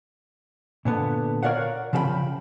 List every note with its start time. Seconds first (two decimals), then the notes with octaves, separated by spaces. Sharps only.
0.85 A#2 D3 B3
1.43 A#4 C#5 D5 F5 F#5
1.93 C#3 F3 A4 F5 G5 B5